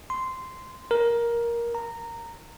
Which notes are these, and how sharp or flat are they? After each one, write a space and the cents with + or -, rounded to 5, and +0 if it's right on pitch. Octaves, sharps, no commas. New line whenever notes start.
C6 -10
A#4 +10
A#5 -15